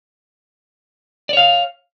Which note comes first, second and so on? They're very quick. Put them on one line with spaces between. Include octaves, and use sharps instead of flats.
D5 C#5 F5